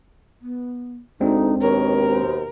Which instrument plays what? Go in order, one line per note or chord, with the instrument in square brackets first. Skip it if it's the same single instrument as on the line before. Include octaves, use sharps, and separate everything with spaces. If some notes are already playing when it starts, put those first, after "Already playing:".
[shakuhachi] B3
[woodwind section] D2 [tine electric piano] G#3 C4 D4 [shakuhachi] D#4
[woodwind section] D#2 B2 [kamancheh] A#4 [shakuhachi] C#5
[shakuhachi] C5